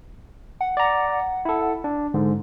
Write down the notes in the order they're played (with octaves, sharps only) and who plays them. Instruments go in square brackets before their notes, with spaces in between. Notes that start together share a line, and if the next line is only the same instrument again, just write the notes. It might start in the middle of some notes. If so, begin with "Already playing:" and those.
[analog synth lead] F#5
[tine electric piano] D5 A#5
E4 A4
D4
[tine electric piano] G#2 [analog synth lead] D3